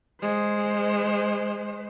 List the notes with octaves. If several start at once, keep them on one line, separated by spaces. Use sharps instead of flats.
G#3 C5